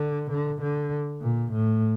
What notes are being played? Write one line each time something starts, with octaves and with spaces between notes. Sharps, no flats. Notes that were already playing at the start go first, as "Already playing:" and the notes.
Already playing: D3
D3
D3
A#2
A2